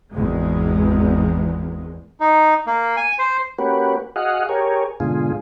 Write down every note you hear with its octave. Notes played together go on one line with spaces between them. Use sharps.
G#1 E2 G#3
D#4
A#3
G#5
C5
A#3 C#4 F#4 G4 B4
F#4 G#4 D#5 F5 F#5
G4 G#4 A#4 C#5
G#2 B2 D3 F4 G#4